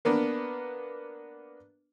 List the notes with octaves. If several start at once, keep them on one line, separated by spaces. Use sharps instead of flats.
A#3 B3 D4